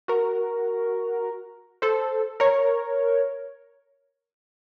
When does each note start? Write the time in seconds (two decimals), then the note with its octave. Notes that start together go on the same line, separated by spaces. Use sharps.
0.08 F#4 A#4
1.82 A4 C5
2.40 A#4 C#5